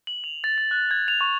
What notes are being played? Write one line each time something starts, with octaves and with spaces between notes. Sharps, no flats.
F#7
F7
A6
A6
F#6
G#6
F7
C#6